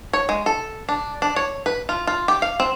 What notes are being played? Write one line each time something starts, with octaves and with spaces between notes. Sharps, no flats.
C#5
G#3
A4
D4
D4
C#5
B4
F4
F4
G4
F5
C4